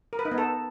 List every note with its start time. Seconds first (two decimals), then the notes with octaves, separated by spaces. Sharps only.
0.13 A#4
0.19 B4
0.25 D#4
0.32 B3
0.38 A4